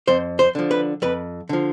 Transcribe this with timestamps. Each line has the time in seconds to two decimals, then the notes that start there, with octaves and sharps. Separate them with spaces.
0.08 F2 C5
0.39 C5
0.55 D3 F3
0.71 B4
1.02 F2 B4
1.49 D3 F3